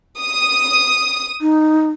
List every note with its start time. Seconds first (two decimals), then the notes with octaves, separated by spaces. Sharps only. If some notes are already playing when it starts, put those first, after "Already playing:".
0.20 D#6
1.41 D#4